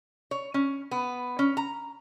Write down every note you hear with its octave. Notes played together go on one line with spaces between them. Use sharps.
C#5
C#4
B3
C#4
A#5